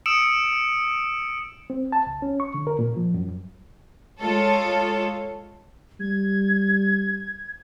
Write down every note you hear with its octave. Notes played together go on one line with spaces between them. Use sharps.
D#6 E6 C#7 D7 E7
C4
A5
C#2
C#4
C#6
D3
A#4
A#2
F3
F#2
G#3 F4 A4 C#5
G3 G#6